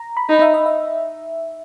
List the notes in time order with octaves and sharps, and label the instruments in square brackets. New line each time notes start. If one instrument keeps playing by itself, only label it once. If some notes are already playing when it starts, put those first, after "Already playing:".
Already playing: [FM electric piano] A#5
B5
[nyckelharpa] D#4 [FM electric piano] A#5
[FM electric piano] E5
D#5
E5